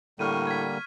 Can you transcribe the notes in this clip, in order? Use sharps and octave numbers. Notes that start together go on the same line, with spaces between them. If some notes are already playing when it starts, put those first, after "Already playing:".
A2 D3 G3 A#3 C#6 F6 D#7
G#6 B6